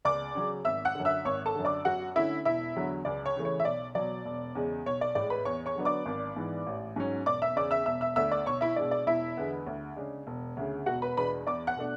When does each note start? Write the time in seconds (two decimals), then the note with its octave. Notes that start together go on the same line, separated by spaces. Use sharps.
0.05 C#2 D5 D6
0.35 C#3 F#3 C#4
0.65 G#1 E5 E6
0.85 F#5 F#6
0.95 F#2 D3
1.05 E5 E6
1.25 G#1 C#5 C#6
1.46 A4 A5
1.55 F#2 D3
1.65 D5 D6
1.85 F#2 F#4 F#5
2.16 D3 A3 C#4 E4 E5
2.45 E1 E4 E5
2.76 E2 D3 F#3
3.05 C#2 D5
3.26 C#5
3.36 C#3 E3 A3
3.45 C#5
3.60 E5
3.65 B1 D5
3.95 B2 F#3 D5
4.25 E1
4.55 E2 C#3 G#3
4.86 B1 C#5
5.01 D5
5.15 A2 D5
5.21 G#3
5.30 B4 B5
5.45 E2 C#5 C#6
5.66 C#5 C#6
5.75 D3 F#3 B3 D4
5.85 D5 D6
6.06 G#1
6.36 G#2 E3 B3
6.67 A1
6.96 G#2 F#3 C#4
7.26 E1 D5 D6
7.42 E5 E6
7.56 E2 C#3 D5 D6
7.71 E5 E6
7.86 E1 E5 E6
8.01 E5 E6
8.16 D2 D3 A3 D4 E5 E6
8.32 D5 D6
8.46 B1 C#5 C#6
8.61 E4 E5
8.76 B2 G#3 D4 D5
8.91 D5
9.06 E1 E4 E5
9.37 E2 D3 G#3 B3
9.67 D2
9.96 C#3 G#3 D4
10.27 E1
10.57 D2 C#3
10.86 E1 F#4 F#5
11.02 B4 B5
11.17 E2 B2 G#3 D4 B4 B5
11.47 E2 D5 D6
11.67 F#5 F#6
11.76 B2 A3 D4